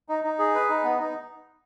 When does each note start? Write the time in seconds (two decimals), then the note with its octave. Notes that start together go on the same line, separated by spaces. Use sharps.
0.09 D#4
0.24 D#4
0.39 G#4
0.54 B4
0.69 D#4
0.83 B3
0.99 D#4